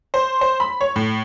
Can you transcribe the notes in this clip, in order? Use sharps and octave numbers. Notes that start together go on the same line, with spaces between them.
C5
C5
B5
C#5
A2